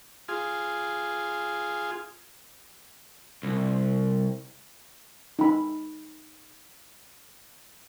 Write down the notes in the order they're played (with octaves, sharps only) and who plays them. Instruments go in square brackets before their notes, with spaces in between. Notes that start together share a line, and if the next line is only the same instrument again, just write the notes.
[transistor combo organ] F4 G#4
[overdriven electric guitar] C2
[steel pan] D#4 B5